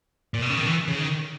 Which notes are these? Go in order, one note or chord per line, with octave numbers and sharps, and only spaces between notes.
A#2
B2
C#3
D#3
E3
C#3
D#3